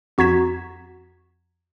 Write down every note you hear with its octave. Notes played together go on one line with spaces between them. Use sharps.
F2 F#4 A#5 G#6 B6 E7